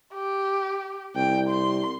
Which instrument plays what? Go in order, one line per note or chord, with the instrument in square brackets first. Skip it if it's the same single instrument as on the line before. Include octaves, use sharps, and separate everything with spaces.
[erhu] G4
[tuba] C2 [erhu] G5
[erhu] C6